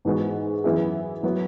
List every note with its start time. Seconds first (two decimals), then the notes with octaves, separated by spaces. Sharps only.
0.05 G#2 E3 G#3 B3 F#4
0.64 F#2 E3 B3 E4 G#4
1.23 F#3 B3 E4